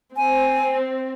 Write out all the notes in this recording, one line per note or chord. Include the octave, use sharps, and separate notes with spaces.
C4 G#5